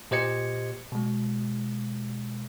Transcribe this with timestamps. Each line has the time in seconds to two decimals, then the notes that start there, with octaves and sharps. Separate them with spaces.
0.11 A#2 G4 C5 D#5 G#6 C#7
0.92 B2 G#3